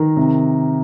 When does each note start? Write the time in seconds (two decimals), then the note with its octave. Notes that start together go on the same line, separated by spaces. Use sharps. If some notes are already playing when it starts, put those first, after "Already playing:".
Already playing: D#3 A#5
0.17 C3